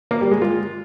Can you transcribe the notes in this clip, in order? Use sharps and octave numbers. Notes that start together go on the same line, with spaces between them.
A#3
G3
G#3
F4